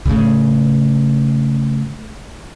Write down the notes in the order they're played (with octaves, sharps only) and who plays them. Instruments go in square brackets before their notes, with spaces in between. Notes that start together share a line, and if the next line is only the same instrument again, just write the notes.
[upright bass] A2 C#3